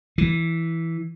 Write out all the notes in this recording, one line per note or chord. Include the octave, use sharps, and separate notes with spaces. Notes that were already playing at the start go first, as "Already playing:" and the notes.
E3